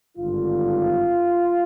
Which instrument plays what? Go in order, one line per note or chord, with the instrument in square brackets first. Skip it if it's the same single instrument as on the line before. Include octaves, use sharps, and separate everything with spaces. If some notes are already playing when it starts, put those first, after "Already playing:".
[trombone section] G#1 G2 D3 F4